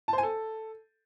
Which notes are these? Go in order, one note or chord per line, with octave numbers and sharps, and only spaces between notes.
A5
C5
G#5
A4